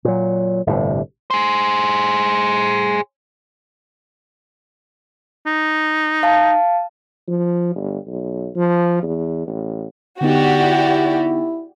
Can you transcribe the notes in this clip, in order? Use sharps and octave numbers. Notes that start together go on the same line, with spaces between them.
A#2 F#3
G1 A2 C3
G#4 C5
D#4
F5 A5
F3
G1
B1
F3
E2
A1
D3 B3 D#4 F#4 G4 D5
E4